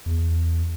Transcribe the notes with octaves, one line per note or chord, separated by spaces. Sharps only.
E2